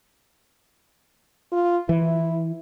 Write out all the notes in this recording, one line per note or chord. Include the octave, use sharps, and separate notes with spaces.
F4
E3 E4